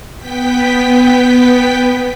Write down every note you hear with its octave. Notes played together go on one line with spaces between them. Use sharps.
B3 G5 B6